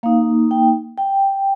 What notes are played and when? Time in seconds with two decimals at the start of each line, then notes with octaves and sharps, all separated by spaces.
0.03 A#3 D#4 F5
0.51 G5
0.98 G5